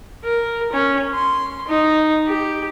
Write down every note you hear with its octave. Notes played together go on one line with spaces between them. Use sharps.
A#4
C#4
C6
D#4
G4